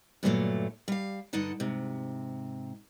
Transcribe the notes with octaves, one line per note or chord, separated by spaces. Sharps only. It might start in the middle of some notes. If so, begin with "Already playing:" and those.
G2 A#2 D3 D#3 F#3 A3
G3 F5
G2 D3 D#4 F#5 A5
G#2 C3